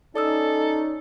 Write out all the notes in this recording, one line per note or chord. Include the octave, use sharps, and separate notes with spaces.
C#4 D#4 A4 D5 D#6 E6